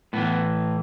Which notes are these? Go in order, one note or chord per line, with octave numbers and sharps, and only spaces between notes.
A2 E3 B3